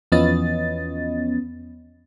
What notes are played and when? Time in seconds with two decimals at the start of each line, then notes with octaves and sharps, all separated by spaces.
0.12 E2 F3 B3 C#4 D#5 A6